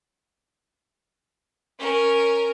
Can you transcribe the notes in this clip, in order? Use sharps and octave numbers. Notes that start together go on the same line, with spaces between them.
C#4 A#4